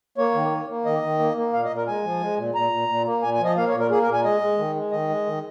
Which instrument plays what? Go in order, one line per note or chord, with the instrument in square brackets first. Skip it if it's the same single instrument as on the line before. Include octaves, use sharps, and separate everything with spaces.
[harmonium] A#3 C#5
D#3
A#3
A#3
D#3 D#5
D#3
A#3
A#3
A#2 F5
D#5
A#2
A#4
G#3 G#5
F3
G#3
A#2
A#2 A#5
A#2
A#2
A#3
A#2 G#5
G#5
F3
D#5
A#3 F5
C#5
A#2
A#4
A#3 G#4
A#4
A#2
G#5
G#3 D#5
G#3
D#3
G#3
D#3 D#5
G#3
D#3